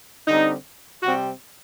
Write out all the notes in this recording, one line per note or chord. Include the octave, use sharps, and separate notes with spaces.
D3 G3 C4 D#4
C3 G3 C4 F#4